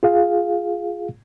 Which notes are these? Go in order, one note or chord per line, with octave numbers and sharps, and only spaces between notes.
F4 G#4 F5